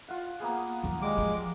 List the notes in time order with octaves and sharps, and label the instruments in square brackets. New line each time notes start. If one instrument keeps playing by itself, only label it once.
[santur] F4 F#5
A#3 B3 G#4
[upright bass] D#3 F#3
[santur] G3 [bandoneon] G#3 D6
[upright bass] F3